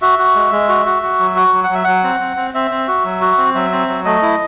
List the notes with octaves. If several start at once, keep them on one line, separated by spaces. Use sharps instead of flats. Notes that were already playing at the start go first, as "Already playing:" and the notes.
F#4 E5
F#4
G#3
G#3
F#4
F#4
F#4
F#3
F#4
F#3
F#5
F#3 E5
F#3 F#5
C4
C4
C4
C4 E5
C4
F#4
F#3
F#4
C4
F#3 E5
C4
F#3
A3 D#5
E4